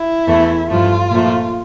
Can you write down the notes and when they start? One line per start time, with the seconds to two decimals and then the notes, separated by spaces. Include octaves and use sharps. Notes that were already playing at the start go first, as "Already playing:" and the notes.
Already playing: E4
0.27 E2 E3 A3
0.69 G2 F3 A3 F4
1.11 A#2 F3 A3